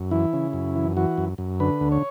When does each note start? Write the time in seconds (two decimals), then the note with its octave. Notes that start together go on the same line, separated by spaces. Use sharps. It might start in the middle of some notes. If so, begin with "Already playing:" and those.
Already playing: F#2
0.11 E3 E4
0.33 C#3
0.53 F#2
0.76 E3
0.97 E3 F#4
1.18 F#2
1.38 F#2
1.60 D3 B4
1.81 D2
1.92 C#5